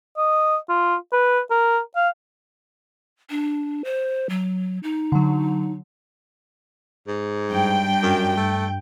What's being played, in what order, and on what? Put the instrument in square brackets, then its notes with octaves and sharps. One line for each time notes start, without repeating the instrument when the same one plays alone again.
[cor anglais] D#5
F4
B4
A#4
F5
[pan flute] D4
C5
F#3
D#4
[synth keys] D3 F#3
[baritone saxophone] G#2
[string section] G2 G5
[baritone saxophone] F#2
A3